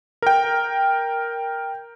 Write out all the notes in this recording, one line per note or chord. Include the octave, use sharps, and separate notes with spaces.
A#4 G5